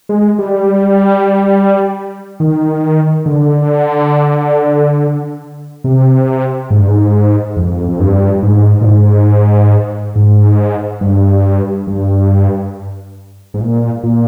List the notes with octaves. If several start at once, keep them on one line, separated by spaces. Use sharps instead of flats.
G#3
G3
D#3
D3
C3
G#2
G2
G#2
F2
F2
G2
G#2
A#2
G#2
G#2
G2
G2
G#2
A#2
A#2